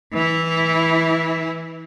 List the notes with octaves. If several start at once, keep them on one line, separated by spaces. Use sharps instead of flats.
E3 E4